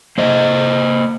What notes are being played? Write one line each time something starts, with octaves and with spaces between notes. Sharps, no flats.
A#3 C5 D#5